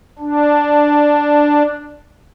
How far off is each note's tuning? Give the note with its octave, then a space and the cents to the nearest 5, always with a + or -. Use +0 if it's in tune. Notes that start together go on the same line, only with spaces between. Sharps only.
D4 +0